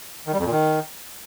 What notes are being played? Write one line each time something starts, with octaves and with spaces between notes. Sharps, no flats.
D#3
G3
F2
A#2
D#3